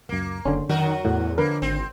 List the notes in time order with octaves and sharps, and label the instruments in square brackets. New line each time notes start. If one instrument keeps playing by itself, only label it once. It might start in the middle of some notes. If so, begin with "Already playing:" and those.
[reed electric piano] C#2 F#2 [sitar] A#3
[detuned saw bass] F#1 [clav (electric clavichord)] D3 C#4 [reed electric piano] C6
[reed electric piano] F2 [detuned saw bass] D#3 [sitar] F#3 F#4 A#4
[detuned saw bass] E2 [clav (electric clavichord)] A2 [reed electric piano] F#5
[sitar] F2 A#3 [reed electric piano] D3 D4 [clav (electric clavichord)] A#4 B4
[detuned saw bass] G#1 [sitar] C4